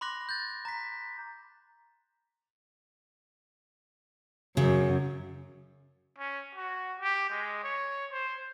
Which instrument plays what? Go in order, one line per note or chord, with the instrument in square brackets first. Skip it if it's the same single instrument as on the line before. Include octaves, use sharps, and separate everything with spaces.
[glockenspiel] B5 C6 D6 F#6 A#6
G6 A6
A#5 B6
[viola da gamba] F#2 [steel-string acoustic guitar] C#3
[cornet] C#4
F#4
G4
G#3
C#5
C5